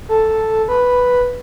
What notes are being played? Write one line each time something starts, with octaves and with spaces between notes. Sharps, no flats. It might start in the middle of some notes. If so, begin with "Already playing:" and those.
A4
B4